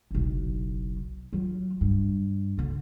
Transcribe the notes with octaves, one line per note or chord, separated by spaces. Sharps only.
F#1 B1
F#3 F4
G2
D3 A#3